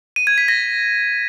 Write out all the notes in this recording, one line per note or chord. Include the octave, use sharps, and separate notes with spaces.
D#7
G#6
B6
A#6